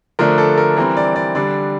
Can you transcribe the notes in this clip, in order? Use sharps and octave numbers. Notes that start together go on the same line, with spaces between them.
D3 F3 A3 D4 A#4
A4
A#4
E3 G3 C4 A#4
D5
D5
D3 G3 D4 D5